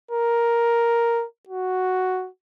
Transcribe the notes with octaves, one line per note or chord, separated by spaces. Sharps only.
A#4
F#4